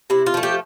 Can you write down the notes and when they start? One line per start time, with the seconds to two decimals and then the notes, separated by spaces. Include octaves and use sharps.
0.10 C3 E4
0.26 F4
0.34 F3 A3
0.43 G4